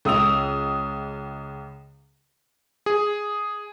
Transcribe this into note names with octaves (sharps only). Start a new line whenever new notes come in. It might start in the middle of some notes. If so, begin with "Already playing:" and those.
C#2 D#6 E6 F7
G#4